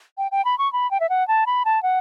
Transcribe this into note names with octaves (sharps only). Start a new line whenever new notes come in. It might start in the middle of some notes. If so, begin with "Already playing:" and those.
G5
G5
B5
C#6
B5
G5
E5
F#5
A5
B5
A5
F#5